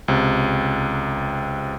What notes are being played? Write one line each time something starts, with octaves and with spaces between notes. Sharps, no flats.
C#2 C3